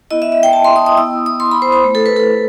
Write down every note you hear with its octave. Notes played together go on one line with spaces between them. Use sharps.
B3 E4 D#5
E5
E5
G5
A5
C6
D#6
D#6
B3 E4 E6
D#6
C6
B5
C5
C5
A3 E4
A4
B4
A4